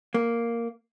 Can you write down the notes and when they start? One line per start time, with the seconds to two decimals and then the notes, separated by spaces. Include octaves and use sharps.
0.14 A#3